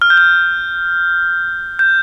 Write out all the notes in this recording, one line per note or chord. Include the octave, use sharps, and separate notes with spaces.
F6
G6
F6
G6